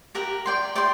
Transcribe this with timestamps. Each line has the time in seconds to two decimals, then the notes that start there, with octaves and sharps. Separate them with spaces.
0.15 G4 A#4 F#5 A#5
0.46 D5 G5 C6
0.75 D5 G5 C6